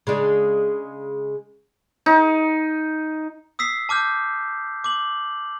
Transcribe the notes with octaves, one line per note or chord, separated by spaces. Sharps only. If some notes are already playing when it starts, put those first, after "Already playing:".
C#3 G#3 D4
D#4
D#6 E6 B6 C7
A5 D6 F6 G6
D6 F#7